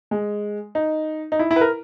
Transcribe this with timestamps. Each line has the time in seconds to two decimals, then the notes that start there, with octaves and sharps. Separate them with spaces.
0.11 G#3
0.75 D#4
1.32 D#4
1.39 E4
1.51 E4
1.56 B4
1.61 A#4